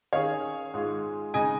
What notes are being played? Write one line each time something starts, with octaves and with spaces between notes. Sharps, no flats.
D#3 C#4 G#4 C#5 F5
G#2 G#3 F4 G#4
C#3 G#3 D#4 D#5 G#5